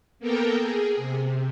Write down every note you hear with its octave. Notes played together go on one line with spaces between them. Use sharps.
A#3 B3 A4 A#4 G5
G#4
C3